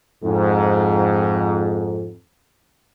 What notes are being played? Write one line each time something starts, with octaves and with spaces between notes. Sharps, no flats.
F2 G#2